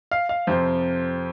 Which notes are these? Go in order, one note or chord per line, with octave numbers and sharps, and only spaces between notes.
F5
F5
F2 C3 F3 C5